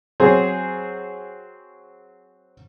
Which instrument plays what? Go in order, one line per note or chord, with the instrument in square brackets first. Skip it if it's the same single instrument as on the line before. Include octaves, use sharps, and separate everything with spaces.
[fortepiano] F#3 C4 G#4 C5